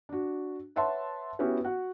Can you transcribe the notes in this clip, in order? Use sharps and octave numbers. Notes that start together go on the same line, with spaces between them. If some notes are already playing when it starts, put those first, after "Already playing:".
D4 F#4
B4 C#5 E5 F#5 A5 C6
B3 C#4 E4 F#4 G4
F#4 F#5